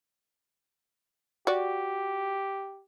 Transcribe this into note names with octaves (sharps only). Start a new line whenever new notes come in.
F#4 G4 D5